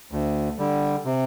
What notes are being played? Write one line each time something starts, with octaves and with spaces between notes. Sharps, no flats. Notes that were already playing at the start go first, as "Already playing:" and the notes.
D2
D3 G3
C3